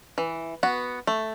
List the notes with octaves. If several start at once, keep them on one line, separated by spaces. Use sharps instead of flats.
E3
B3 F#4
A3